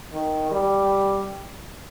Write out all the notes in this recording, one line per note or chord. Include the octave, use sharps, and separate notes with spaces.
D#3
G3